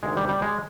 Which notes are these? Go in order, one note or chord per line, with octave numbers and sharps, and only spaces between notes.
D2 C3 D#3 G#3
G3
G3
G#3